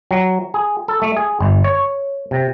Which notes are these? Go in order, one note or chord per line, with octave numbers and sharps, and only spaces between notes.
F#3
G#4
A4
A3
G#4
G1
C#5
C3